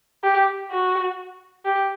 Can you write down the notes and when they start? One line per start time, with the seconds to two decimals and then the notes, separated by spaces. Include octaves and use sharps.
0.24 G4
0.71 F#4
1.65 G4